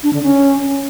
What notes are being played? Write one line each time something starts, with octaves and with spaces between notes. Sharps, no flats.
D4
D3
C#4